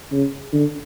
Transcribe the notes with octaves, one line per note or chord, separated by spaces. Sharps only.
C#3
D3